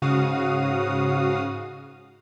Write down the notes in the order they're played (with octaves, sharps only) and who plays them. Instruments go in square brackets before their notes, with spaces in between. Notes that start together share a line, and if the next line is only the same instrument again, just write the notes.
[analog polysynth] G#2 C#3 F#4 F5 D#6